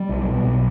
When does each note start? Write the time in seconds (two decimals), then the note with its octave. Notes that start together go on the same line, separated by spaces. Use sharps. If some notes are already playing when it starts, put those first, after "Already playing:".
Already playing: G3
0.09 B1
0.26 B2
0.44 B1